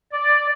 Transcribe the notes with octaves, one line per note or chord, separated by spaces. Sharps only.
D5